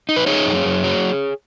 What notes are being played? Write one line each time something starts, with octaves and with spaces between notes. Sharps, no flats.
D#4
B4
D#4 G#4 C#5
F#2
F#2
F#3